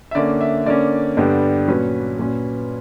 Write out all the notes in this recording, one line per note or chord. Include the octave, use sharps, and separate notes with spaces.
E5
D3 A#3 C#4 D5
E5
D3 A#3 C#4 D5
G2 D3 G3 B3 D4
A#2 F#3 C#4 B4
A#2 F#3 C#4